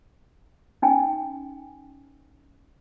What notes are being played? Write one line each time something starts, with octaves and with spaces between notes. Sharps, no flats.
C#4 D#4 G5 G#5